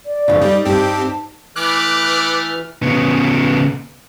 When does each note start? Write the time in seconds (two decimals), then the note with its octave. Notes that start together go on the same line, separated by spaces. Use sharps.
0.05 D5
0.28 F2 G#2 C#3
0.41 G3 D#4
0.65 G2 C4 G4 A5
1.56 E3 A3 B4 D6 F6 F#6
2.83 C#3 B3